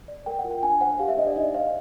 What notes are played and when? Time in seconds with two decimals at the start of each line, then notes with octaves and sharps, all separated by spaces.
0.08 D5
0.26 A#4 G5
0.39 F#5
0.44 F4
0.51 G5
0.63 D4 G#5
0.81 C5 F#5
0.99 G4 F5
1.08 E5
1.17 D4 D#5
1.27 D5
1.36 D#4 D#5
1.54 C5 F5